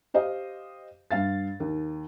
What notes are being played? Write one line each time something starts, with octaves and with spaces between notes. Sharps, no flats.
G4 C5 D#5 F5
G2 F5 A6
D#2